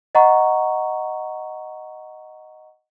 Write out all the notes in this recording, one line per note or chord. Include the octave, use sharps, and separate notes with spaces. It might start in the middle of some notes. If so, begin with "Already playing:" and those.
D#5 F#5 A#5 C#6